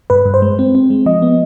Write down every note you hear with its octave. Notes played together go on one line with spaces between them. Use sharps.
G2 B4
G2
C5
G#3
C4
C4
G#3
F3 D#5
B3